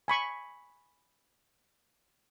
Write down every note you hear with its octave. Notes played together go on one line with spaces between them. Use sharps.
G#5 B5 C#6